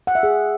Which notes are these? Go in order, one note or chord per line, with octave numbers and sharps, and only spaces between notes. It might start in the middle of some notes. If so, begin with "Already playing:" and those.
F#5
E5
G#4